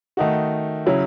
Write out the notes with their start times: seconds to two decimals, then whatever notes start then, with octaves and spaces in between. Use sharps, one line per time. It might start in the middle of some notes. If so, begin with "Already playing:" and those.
0.17 D#3 A3 D#4 F#4
0.86 C#3 F#3 C#4 E4